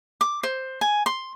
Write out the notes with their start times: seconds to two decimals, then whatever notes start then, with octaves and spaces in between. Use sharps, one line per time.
0.21 D6
0.43 C5
0.81 G#5
1.06 C6